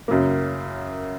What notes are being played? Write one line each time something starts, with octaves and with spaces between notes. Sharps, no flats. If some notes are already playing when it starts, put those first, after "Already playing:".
F#2 C#3 F#3 A#3